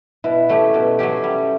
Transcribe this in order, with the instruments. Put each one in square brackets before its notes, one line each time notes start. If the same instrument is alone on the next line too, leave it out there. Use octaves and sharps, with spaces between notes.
[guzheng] B2 [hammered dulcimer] E4
[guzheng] F#3 A3 C#4 G4
B2
F#3 A3 C#4 G4
G3